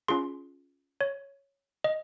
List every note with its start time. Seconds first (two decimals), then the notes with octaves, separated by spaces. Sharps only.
0.08 C#4 F4 G#4 C6
1.01 C#5
1.84 D#5